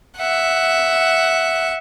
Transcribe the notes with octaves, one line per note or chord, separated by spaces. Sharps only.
E5 F#5